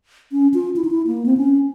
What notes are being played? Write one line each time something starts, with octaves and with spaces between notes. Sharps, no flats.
C#4
F4
E4
D#4
E4
A#3
C4
C#4